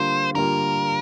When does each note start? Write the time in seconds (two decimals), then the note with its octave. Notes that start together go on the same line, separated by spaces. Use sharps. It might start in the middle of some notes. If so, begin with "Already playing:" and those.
Already playing: D3 G3 A#3 F4 C5
0.35 D3 G3 A#3 F4 A#4